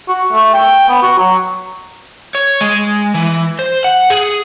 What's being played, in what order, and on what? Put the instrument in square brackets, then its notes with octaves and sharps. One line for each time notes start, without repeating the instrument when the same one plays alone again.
[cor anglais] F#4
A3
G5
B3
F#4
F#3
[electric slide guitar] C#5
G#3
E3
C5
F#5
G#4